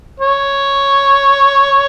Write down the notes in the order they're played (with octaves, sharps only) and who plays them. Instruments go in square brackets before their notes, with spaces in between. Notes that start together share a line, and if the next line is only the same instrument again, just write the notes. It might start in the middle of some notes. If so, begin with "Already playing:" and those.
[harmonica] C#5